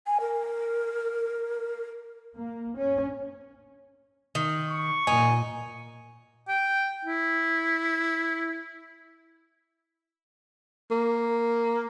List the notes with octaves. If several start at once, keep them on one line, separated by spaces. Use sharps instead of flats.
G#5
A#4
A#3
C#4
D#3
C#6
A#2 D#4 G#5
G5
E4
A#3